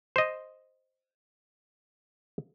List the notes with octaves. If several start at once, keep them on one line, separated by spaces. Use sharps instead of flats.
C5 D#5